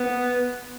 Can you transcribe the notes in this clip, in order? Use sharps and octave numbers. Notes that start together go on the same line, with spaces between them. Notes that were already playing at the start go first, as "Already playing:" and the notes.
Already playing: B3